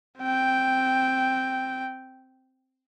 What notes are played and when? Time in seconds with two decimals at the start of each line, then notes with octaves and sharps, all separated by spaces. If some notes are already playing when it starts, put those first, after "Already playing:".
0.18 C4 G5